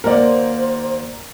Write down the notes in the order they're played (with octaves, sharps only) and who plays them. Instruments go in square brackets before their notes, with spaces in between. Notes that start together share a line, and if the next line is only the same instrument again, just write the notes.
[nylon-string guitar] D#2 A#3 F#5 [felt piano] A#4 D5 [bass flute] C5